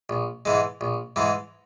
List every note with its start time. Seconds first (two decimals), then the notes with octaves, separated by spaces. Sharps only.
0.09 A#1
0.45 G#2 E3 G#3
0.81 A#1
1.16 G#2 E3 G#3